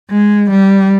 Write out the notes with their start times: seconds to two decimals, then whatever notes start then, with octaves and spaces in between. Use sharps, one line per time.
0.10 G#3
0.50 G3